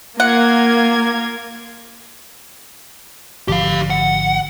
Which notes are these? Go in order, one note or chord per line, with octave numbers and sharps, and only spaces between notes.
A#3 F4 A#4 F#5 G#6
G#1 D3 F3 G4 F5
F#5